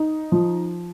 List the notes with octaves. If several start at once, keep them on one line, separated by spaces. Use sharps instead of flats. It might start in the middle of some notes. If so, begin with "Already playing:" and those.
Already playing: D#4
F3